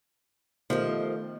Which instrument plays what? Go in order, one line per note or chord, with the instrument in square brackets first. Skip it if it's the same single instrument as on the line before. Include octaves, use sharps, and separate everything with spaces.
[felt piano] B2 D#3 G4 [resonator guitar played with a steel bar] F3 [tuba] A3 [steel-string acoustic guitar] A#4 C5 D#5